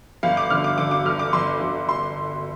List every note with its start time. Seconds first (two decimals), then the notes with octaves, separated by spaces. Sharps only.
0.23 G1 F5
0.37 D6
0.50 D3 F6
0.64 D6
0.78 D3 D6
0.91 D6
1.05 G1 F6
1.19 D6
1.33 G1 C6
1.61 G1
1.89 C6